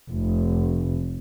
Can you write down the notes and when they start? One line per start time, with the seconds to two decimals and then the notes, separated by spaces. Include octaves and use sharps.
0.11 F1